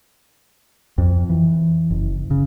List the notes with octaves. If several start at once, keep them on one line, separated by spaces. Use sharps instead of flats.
F2
E3
F#1
C#3